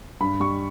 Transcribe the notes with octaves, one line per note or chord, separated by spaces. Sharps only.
G2 B5
G3 C#6